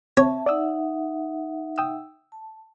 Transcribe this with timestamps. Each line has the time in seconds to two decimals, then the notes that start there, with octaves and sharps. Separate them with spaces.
0.17 C4 C#5 E5 A5
0.46 D#4 D5 E5 F#5 D#6 E6
1.78 G5 D#6 E6
2.32 A5